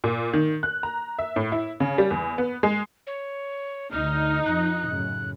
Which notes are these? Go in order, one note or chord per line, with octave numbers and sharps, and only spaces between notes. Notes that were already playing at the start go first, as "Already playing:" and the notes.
A#2
D#3
F#6
A#5
E5
A2
E4
C#3
G3
E2
B3
G#3
C#5
D2 D3 D#4 F6
F2 F3 F#6
F#2 A2 C#3